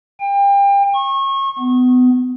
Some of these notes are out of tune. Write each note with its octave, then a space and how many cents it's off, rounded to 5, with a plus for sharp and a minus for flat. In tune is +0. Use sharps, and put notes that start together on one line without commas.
G5 +30
C#6 -30
B3 +30